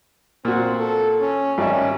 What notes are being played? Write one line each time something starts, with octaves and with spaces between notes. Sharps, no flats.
A#2 C4 F#4
A4
C#4
G#1 G3 C#4 E5